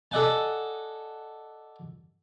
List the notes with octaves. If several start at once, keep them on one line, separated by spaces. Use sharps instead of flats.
A4 D5 D#5 F#5 G#5 A5